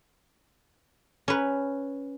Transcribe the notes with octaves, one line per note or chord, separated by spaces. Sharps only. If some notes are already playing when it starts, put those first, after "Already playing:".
C#4 B4